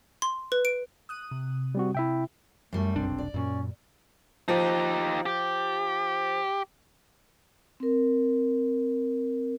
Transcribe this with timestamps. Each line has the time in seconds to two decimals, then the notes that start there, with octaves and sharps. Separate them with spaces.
0.22 C6
0.52 B4
0.65 D7
1.09 D#6 F#6 D#7
1.31 C3
1.75 G3 C4 F#4
1.95 C3 E4 E5 G5
2.73 F#2 G3 A3
2.96 F1 B1 C4 D4
3.18 D5
3.34 F#2 A#2 C#4
4.48 F3 D#4 G4
5.26 G4
7.80 C4 A#4